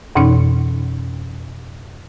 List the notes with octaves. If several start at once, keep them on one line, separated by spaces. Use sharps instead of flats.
F2 B2 E3 C#4 D#4